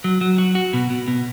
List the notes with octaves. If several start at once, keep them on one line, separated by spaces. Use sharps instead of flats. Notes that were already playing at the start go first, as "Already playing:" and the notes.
F#3
F#3
F#4
F#4
B2
B2
B2